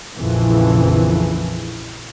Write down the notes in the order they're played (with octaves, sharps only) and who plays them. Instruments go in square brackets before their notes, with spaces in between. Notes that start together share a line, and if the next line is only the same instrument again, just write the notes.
[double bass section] A#1 F2 C#3 E3